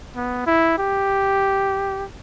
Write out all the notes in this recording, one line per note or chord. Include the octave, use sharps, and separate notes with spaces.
B3
E4
G4